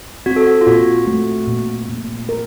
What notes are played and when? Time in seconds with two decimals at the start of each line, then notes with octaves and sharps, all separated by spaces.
0.26 C4 F#4
0.36 A4
0.47 F#4
0.61 F4
0.67 A#2 F#4
1.07 A3
1.48 A#2
1.89 A#2
2.29 A#4